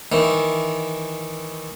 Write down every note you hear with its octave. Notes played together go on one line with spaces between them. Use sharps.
D#3 E3